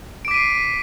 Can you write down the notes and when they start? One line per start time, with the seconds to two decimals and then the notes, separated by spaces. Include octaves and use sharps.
0.25 D7
0.28 D6
0.31 B6
0.34 D#7
0.38 C7